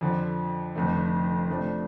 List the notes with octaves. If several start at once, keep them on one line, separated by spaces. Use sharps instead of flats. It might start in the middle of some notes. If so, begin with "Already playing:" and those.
F2 D3 F3
F1 F2 D3 A3
F2 C3 F3 A3 D4